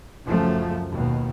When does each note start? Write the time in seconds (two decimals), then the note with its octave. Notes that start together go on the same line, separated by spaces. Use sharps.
0.25 C#2 F#2 F3 A3
0.89 D#2 B2